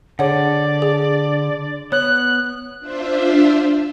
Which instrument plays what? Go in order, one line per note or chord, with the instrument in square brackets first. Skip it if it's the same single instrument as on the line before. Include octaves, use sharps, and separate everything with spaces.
[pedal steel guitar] D3 [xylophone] G#4 C#5 F#5 [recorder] D5
[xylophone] G#4
[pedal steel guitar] B3 [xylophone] C#5 [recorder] F#6
[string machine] D4 F4 C5 E5